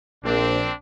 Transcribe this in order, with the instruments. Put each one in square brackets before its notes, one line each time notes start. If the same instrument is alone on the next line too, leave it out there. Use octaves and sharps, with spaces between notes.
[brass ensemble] A#1 [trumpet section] C4 D4